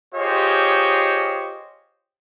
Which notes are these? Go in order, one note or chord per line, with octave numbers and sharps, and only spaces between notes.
F4 G4 G#4 C5 C#5 D#5